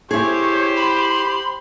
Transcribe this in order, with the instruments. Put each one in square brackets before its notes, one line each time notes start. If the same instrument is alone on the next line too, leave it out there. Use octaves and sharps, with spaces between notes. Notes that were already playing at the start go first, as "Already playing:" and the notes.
[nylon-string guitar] E4 G#4 [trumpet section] G4 C5 [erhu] C#5
[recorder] B5 [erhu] C6